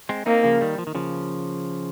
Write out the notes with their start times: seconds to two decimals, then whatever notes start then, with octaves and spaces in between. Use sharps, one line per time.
0.09 G#3 C4
0.26 A#3 C4 D#4
0.44 C#3 F3
0.61 D#3 G3
0.78 F3
0.87 D#3
0.95 C#3 F3